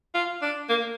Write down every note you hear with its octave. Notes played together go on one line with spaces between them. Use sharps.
F4
D4
A#3